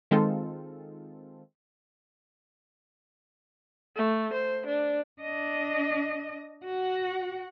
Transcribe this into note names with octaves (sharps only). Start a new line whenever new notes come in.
D#3 G#3 C4 F4 A4
A3
C5
D4
D4 D#5
F#4 F#5